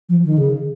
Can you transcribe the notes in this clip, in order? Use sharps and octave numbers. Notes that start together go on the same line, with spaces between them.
F3
D#3
C#3